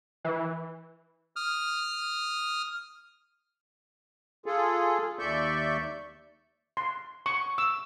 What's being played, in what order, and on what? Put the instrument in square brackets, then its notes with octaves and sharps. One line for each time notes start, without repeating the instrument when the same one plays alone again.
[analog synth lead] E3
[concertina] D#6 F6
[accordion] F4 G#4 A4
D#2 D5 E5 C#6 G6
[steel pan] C6
C#6
E6